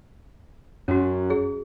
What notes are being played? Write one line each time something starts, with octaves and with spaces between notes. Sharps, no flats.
F#2 C#4 F#4
G#4